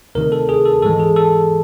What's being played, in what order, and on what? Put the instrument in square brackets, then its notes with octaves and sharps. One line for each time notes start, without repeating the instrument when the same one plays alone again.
[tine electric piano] D2 C3 D#3 A#4
A4
G#4
A4
G#2 E3 G#3 A4
G#4
A4